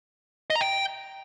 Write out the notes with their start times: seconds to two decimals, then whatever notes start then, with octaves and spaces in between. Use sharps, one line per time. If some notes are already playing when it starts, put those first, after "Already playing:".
0.50 D#5
0.56 A#5
0.61 G5